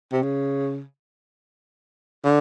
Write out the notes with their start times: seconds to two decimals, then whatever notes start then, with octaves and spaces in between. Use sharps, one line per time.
0.12 C3
0.22 C#3
2.24 D3